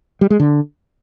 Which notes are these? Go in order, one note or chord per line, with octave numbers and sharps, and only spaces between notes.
G3
G#3
D3